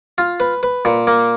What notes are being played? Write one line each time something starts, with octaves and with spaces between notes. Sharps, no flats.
F4
B4
B4
A#2
A#3